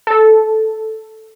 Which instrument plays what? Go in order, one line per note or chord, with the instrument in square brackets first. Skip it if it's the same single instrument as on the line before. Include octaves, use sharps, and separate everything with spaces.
[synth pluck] A4